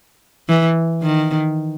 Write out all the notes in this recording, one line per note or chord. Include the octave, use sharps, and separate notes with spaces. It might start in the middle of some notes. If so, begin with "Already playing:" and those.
E3
D#3